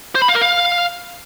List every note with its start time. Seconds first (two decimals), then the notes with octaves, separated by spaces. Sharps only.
0.15 C5
0.22 B5
0.28 F5
0.35 A#4
0.41 F5